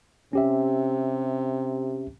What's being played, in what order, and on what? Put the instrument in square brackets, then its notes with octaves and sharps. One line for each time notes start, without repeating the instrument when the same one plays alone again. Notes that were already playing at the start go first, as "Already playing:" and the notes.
[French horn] C3 [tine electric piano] C#4 G4 E5